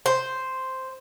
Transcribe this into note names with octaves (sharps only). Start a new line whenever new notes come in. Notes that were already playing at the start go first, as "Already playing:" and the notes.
C5